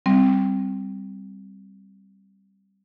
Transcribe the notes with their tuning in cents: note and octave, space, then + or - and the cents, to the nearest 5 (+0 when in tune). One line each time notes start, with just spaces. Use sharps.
G3 +0 C4 +0